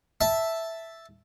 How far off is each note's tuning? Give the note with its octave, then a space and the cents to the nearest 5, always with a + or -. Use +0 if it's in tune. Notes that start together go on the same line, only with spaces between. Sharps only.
E5 +0 A5 +0